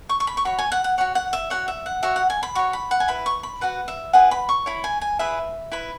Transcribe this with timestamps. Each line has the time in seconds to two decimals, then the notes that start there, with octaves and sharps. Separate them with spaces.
0.09 C#6
0.20 C#6
0.27 B5
0.37 C#6
0.45 F#4 C#5 B5
0.59 G#5
0.72 F#5
0.84 F#5
0.98 F#4 C#5 F#5
1.15 F#5
1.33 E5
1.50 F#4 C#5 F#5
1.68 E5
1.86 F#5
2.03 F#4 C#5 E5
2.16 F#5
2.30 G#5
2.43 B5
2.55 F#4 C#5 C#6
2.73 B5
2.91 F#5
3.00 G#5
3.08 E4 B4 B5
3.26 C#6
3.43 B5
3.61 F#4 B4 F#5
3.88 E5
4.13 E4 G#4 B4 F#5
4.31 B5
4.49 C#6
4.66 E4 C#5 B5
4.84 G#5
5.01 G#5
5.19 E4 G#4 B4 E5
5.72 E4 B4 B5